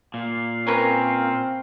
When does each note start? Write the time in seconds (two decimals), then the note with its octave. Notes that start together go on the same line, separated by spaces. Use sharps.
0.14 A#2 F5
0.67 C4 C#4 A#4 B4